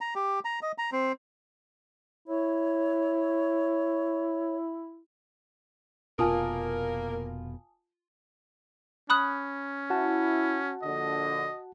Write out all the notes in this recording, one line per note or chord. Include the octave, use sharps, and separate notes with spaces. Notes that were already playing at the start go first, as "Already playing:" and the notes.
A#5
G4
A#5
D#5
A#5
C4
E4 C#5
F1 B2 A#3 F4 A#4 G#5 A5 D#6
C#4 B5 D#6 F#6
E4 F#4 F#5 A5
A#1 D3 D#5